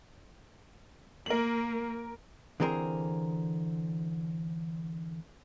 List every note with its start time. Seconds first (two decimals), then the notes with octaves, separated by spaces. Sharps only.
1.26 A#3 A#4 F#7
2.60 D3 E3 C4 G#4 A#4